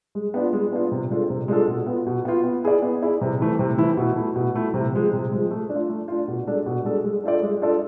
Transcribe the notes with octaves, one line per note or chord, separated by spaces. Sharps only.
G#3
B3 D4 F4
G#3
B3 D4 F4
C3
G#3 D4 F4 A4
C3
G#3 D4 F4 A4
B2
B3 F4
B2
B3 F4
B3
E4 G#4 D5
B3
E4 G#4 D5
C3
E3 A3 E4
C3
E3 A3 E4
B2
A3 E4
B2
A3 E4
C3
F3 G#3
C3
F3 G#3
A3
D4
F4
A3
D4 F4
B2
G#3 D4 A4
B2
G#3 D4 A4
G#3
D4 F4 A4 D5
G#3
D4 F4 A4 D5